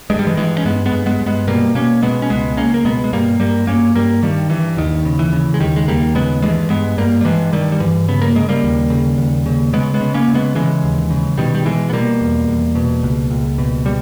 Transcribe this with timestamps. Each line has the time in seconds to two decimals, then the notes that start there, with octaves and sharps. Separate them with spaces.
0.10 G2 G#3
0.19 G3
0.27 E3 G#3
0.37 G2 E3 G#3
0.58 C#4
0.65 G2 G#3 B3
0.86 G#3 B3
0.92 G2
1.06 G#3 B3
1.20 G2
1.26 G#3 B3
1.47 B2 G3 A#3
1.75 B2 A#3 C#4
2.02 B2 G#3 B3
2.22 C#4
2.30 C#2 G#3 B3
2.57 C#2 A#3 C#4
2.74 A#3
2.85 B2 G#3 B3
3.04 G#3
3.13 G2 G3 A#3
3.40 G2 G3 A#3
3.67 G2 A#3 C#4
3.95 G2 G3 A#3
4.23 G2 D#3 G3
4.50 G2 E3
4.77 D#2 D#3
5.05 C#3
5.19 E3
5.33 C#3
5.54 G#3
5.60 D#2 D#3 G3
5.76 G#3
5.88 D#2 G3 A#3
6.15 C#3 G#3 B3
6.42 G2 E3 G#3
6.70 G2 G#3 B3
6.98 G2 G3 A#3
7.21 G3
7.25 G2 E3 G#3
7.53 G2 D#3 G3
7.72 G3
7.80 G2 E3
8.08 C#3 B3
8.22 A#3
8.35 C#3 G#3
8.49 G3 A#3
8.64 D#2
8.90 C#3
9.18 D#2
9.46 C#3
9.73 C#3 G#3 B3
9.94 G#3 B3
10.01 C#3
10.14 A#3 C#4
10.28 C#3
10.34 G#3 B3
10.55 C#3 E3 G#3
10.84 D#2
11.10 C#3
11.38 B2 D#3 G3
11.55 G3
11.65 B2 E3 G#3
11.90 B3
11.93 B2 G3 A#3
12.21 E2
12.49 E2
12.75 B2
13.03 C#2
13.30 C#2
13.58 B2
13.85 B2 G3